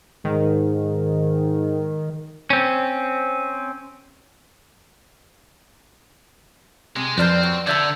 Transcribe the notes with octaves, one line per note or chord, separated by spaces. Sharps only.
G#2 D#3
C4 C#4
C3 G#3
F2 C4 B4 C5 D5 A#5 F6 G6
F#3
D3 D5 E5 A#5 E6 G6 G#6